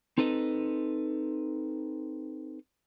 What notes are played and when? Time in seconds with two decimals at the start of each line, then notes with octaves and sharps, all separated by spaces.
0.18 C4 D#4 A4 B4 D#5